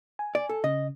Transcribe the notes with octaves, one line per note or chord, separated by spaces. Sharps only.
G#5
D5
A4
C#3 D#5